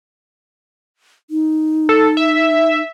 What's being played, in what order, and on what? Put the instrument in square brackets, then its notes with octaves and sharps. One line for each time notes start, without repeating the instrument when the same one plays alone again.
[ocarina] D#4
[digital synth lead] A4
E5